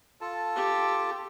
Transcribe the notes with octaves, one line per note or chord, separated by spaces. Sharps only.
F4 A4 A5
G4